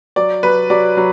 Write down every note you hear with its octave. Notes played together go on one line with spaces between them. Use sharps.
F#3 D5
F#3 B4
F#3 D5
F#3